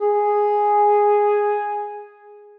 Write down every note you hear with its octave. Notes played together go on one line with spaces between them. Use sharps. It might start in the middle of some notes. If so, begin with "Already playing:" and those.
G#4